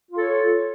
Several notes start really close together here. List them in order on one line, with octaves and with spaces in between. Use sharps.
F4 A4 C#5